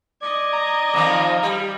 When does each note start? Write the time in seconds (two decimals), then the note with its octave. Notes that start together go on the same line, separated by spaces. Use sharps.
0.22 D5 D#5 G#6
0.53 A#5
0.94 F2 D#3 F3
1.43 G3